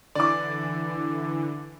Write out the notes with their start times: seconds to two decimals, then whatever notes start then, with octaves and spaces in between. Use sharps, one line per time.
0.15 D3 E3 D5 D6